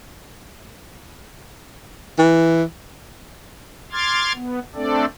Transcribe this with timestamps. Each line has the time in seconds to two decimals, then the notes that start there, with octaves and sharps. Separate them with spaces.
2.18 E3
3.92 C6 D6 F6 G#6 A6
4.34 B3
4.75 A3 C4 D4 A4 D5